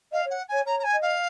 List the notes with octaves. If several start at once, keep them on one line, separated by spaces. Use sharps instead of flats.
D#5 F5
C#5
F#5
C#5 G#5
C#5 A#5
A#5
G#5
D#5
F5